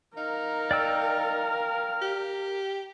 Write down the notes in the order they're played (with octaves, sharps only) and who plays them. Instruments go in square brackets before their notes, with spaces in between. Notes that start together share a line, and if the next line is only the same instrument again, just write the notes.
[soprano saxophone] D#4 [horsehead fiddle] A#4 [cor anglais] F5
[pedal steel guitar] D5 G5 E6
[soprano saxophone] G4